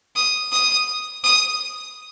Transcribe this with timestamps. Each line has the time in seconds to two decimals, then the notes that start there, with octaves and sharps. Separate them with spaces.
0.16 D#6
0.52 D#6
1.24 D#6